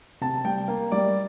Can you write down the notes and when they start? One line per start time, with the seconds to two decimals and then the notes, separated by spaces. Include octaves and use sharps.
0.21 C3 A5
0.45 G3 G5
0.68 A#3
0.92 G3 D5